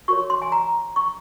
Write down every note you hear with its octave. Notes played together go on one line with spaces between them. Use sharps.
F#4 A#4 C#5 C#6
C6
G#5
A#5
C#6